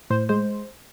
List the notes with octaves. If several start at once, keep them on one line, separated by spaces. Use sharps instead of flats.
A2 C5
G#3 C5